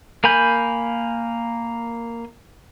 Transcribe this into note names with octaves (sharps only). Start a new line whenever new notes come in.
A#3 A#4 G#5 B5 G6